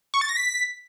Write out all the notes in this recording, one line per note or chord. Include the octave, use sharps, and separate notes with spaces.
C#6
A6
A#6
B6